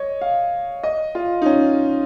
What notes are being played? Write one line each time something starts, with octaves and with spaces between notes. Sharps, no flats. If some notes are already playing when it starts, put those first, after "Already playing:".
Already playing: C#5 D#5
F5
D#5
F4
D#4
C#4